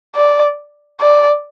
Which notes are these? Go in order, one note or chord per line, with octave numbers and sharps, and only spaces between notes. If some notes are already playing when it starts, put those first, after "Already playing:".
D5
D5